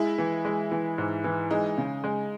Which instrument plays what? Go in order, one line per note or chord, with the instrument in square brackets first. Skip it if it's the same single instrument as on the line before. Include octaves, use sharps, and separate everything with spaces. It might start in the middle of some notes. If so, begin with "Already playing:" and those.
Already playing: [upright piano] G#3 [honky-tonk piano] E4
[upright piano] E3
G#3
E3
G#2
E3
[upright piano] G#3 [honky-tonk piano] D#4
[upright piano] C#3
G#3